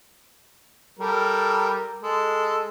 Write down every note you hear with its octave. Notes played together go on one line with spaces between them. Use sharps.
G3 A4 A#4
G#3 A4